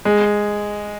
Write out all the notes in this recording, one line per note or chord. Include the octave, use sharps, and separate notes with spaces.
G#3